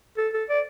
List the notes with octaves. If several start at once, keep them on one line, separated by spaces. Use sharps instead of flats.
A4
A4
D5